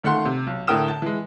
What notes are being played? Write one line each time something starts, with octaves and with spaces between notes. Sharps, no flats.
C#2 D#3 A3 F#5 C6
C3
B1
A2 D3 A#4 G5 D#6 E7
A5
E3 G#3